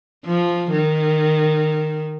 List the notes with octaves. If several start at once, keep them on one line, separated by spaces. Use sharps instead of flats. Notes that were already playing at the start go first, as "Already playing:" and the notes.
F3
D#3